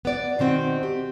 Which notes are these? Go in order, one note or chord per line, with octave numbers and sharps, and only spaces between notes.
B3 D5
B2 D#3 C4 F#4
G4